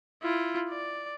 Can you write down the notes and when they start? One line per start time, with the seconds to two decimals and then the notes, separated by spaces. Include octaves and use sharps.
0.22 E4 F4
0.70 D5